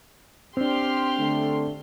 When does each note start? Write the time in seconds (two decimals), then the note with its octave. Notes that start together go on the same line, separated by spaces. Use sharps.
0.57 C4 D4 G4 C6 F6
1.19 D3 A3